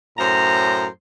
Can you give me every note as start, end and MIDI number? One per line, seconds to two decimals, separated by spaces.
0.18 0.86 42
0.18 0.86 45
0.18 0.86 72
0.18 0.86 82